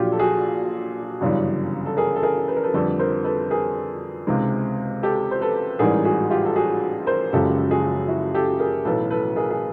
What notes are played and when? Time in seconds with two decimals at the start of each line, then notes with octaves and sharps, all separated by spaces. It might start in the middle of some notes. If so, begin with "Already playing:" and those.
Already playing: A#1 A#2 F#3 F4 G4
0.12 A4
0.19 F#4 G#4
1.21 G1 F#2 C#3 E3 G3
1.86 A4
1.97 G#4 A#4
2.16 A4
2.23 G#4 A#4
2.48 B4
2.57 A#4
2.63 A4 B4
2.74 F2 D3 G3 A4 B4
2.99 A#4 C5
3.24 A4 B4
3.51 G#4 A#4
4.27 C#2 C3 D#3 G#3
5.03 G4 A4
5.31 C5
5.41 A4 B4
5.79 A1 G#2 E3 G3 G#4 A#4
6.05 F#4 G#4
6.30 F4 G4
6.45 A4
6.55 F#4 G#4
7.07 A#4 C5
7.33 F#1 F#2 C#3 F3 G#3 G4 A4
7.71 F#4 G#4
8.08 E4 F#4
8.35 G4 A4
8.59 G#4 A#4
8.85 B1 A2 E3 A4 B4
9.10 A4 B4
9.36 G#4 A#4
9.50 G#4